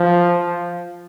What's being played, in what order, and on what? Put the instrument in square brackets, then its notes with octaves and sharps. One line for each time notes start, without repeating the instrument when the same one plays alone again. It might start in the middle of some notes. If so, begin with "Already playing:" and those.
Already playing: [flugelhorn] F3